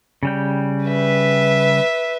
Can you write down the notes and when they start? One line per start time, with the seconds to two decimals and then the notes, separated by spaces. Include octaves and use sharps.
0.23 C#3 G3 G5
0.86 B4 E5